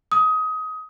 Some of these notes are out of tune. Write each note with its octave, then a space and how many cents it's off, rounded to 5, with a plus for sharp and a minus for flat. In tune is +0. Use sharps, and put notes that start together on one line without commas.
D#6 +20